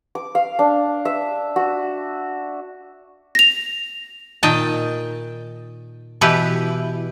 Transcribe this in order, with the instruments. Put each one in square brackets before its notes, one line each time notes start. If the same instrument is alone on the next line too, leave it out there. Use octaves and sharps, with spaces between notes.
[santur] D6
F5
D4
E5
F#4
[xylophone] A#6 F7
[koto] A#2 D#3 D#5 G5 A5
B2 E3 E4 G4 B4